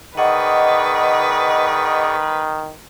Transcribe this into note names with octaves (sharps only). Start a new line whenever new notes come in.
D#3 G#4 B4 D5 D#5 F#5 C#6